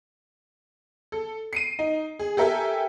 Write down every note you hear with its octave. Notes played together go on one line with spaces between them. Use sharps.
A4
C7 D7 D#7
D#4
G#4
G4 A4 A#4 E5 G5 G#5